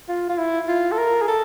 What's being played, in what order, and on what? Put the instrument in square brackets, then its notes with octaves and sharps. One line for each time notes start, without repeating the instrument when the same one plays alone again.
[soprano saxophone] F4
F4
E4
F4
A4
A#4
G#4
A4